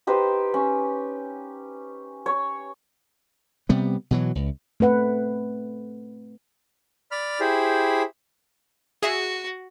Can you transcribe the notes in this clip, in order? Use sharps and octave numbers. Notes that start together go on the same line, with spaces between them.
D#4 G4 B4 C5
C#4
C#5
C3 G3 B3
B2 E3 F#3
C#2
A3 C4 B4 F#5
D5 B5 F6
E4 G4 G#4 C5 B5
F#4 G#4 E5